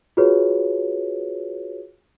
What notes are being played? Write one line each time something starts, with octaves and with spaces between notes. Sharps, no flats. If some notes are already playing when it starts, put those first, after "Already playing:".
F4 F#4 G#4 B4 C#5